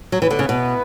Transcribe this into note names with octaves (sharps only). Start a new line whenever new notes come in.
F#3
E3 B3 E4 B4
D3
C#3
B2